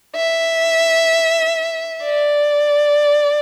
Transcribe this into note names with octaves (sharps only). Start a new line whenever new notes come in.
E5
D5